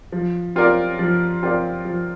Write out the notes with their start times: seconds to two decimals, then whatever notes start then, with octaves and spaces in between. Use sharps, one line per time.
0.12 F3
0.56 C4 F4 A#4 D5
0.99 F3
1.43 C4 F4 A#4 D5
1.85 F3